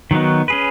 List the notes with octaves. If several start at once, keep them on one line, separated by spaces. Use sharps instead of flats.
D#3 F#3 B3 D#4 F#4
C#4 G#4 B4